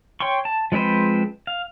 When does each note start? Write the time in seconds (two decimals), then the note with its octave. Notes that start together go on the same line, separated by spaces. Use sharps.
0.20 C#5 G5 C6 C#6
0.45 A5
0.72 F3 G#3 C4 B4 C5
1.47 F5